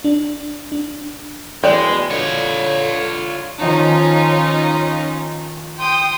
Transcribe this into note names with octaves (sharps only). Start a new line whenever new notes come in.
D4
D4
B2 E3 G#3 D5 G5
B2
D3 F4 C#5
D#3 F3 C#4 D#4 F4
G5 C6 D#6